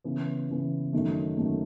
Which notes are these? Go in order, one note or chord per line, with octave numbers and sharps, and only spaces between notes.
C#3 E3 B3
C#3 E3 B3
F#2 D#3 A3
F#2 D#3 A3